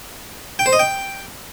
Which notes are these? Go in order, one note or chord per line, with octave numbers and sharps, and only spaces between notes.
G5
C5
D#5
G5